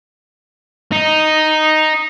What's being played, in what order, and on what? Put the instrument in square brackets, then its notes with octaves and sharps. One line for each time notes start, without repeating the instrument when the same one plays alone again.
[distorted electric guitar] D#4